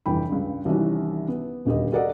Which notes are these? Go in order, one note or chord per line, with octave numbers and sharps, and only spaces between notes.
F1 G2 E3 G5 B5
C#2 G2
C2 C3 D#3 E3 C#4 F#4
B3
D#1 D2 G4 D#5
F#4 A4 A#4 D5 D#5 F#5